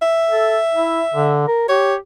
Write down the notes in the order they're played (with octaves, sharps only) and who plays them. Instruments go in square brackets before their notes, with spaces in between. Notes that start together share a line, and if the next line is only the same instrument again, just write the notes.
[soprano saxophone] E5
[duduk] A4
E4
D3
A#4
[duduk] G4 [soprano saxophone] C#5